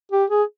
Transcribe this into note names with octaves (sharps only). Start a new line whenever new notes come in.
G4
G#4